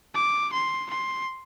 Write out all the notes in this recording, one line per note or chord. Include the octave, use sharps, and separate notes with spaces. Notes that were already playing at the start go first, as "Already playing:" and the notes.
D6
C6
C6